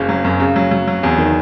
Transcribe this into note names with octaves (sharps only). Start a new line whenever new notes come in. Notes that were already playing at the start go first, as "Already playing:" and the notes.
Already playing: F#1 C#3
F#3
F#2
C#3
F#3
F#3
F#3
E2
D#3